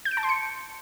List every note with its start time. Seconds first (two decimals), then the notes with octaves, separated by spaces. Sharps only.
0.05 G6
0.11 D7
0.17 A5
0.23 C6
0.29 C#7